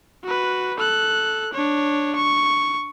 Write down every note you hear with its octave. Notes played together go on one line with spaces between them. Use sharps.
F#4 B4
A4 F#6
D4 C#5
C#6